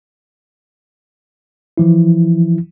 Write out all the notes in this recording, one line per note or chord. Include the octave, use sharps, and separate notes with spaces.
E3 F3 E4